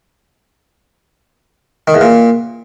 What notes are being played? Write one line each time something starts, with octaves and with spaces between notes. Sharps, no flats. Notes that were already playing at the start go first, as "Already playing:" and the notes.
D#3
E2
A#2